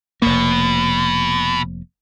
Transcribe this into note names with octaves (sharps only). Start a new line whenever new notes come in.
F1 B2 A#3